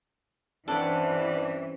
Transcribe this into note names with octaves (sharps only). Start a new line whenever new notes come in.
G2 C3 E3 C#4 D4 A4 F#5